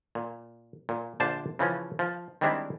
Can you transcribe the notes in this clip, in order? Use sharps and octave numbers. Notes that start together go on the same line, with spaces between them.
A#2
A#2
A#1 D3 F3 D4 C5 A5
C#3 E3 F3 C#4
F3
D#3 G3 G#3 C4 D4 E4